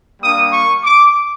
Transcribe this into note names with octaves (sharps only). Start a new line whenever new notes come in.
G3 A#3 D4 D#6
C#6
D6